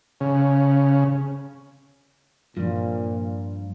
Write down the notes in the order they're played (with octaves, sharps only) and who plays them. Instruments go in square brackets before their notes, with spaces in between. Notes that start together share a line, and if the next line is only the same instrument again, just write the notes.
[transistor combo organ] C#3
[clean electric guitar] G2 [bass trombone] A#2 [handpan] F3 F4